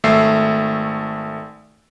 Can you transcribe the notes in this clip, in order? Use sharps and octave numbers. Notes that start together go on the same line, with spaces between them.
G#1 A3 E5 E6 C7